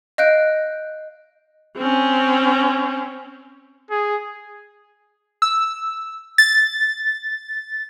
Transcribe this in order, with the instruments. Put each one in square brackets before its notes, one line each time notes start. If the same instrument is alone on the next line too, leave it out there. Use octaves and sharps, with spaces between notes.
[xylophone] D#5 F5 F#6 G6 D7
[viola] C4 C#4
[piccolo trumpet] G#4
[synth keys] E6
A6